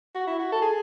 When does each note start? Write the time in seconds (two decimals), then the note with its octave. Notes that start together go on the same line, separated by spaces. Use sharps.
0.15 F#4
0.27 E4
0.39 F#4
0.52 A4
0.62 G#4